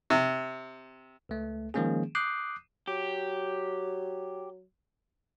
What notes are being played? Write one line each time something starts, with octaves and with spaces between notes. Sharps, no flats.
C3
C#2 A3
D#3 F3 G#3 A#3 C#4 G#4
D6 D#6 F#6 G6 C7
F#3 G4